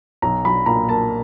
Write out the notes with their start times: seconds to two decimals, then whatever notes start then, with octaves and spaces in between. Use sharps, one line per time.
0.22 B1 A#5
0.44 F#3 B5
0.66 A#2 A#5
0.88 A#3 A5